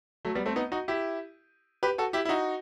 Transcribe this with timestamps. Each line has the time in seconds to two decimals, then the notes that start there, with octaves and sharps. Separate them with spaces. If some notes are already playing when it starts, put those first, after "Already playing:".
0.25 F#3 A3
0.35 G3 B3
0.46 A3 C4
0.56 B3 D#4
0.72 D#4 F#4
0.88 E4 G4
1.83 G4 B4
1.98 F#4 A4
2.13 E4 G4
2.25 E4
2.29 D#4 F#4